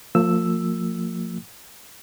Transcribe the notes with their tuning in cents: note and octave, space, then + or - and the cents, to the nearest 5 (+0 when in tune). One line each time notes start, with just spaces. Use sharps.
F3 +15 A#3 -45 E6 +0